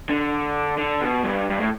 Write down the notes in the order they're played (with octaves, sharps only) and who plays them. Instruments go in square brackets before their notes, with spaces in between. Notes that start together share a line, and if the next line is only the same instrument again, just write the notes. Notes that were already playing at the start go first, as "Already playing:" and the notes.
[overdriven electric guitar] D3
D3
B2
G2
G2
A2